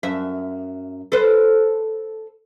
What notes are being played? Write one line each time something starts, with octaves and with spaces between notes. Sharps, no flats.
F#2 E5
A4 B4 C5